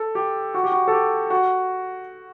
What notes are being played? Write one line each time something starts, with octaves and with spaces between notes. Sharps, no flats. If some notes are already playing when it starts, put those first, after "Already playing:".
Already playing: A4
G4
F#4
G4
F#4
A4
G4
F#4